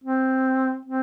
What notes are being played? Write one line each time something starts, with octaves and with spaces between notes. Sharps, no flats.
C4
C4